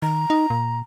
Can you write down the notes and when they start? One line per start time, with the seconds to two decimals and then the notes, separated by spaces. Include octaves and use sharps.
0.02 D#3 A#5
0.30 D#4
0.50 A#2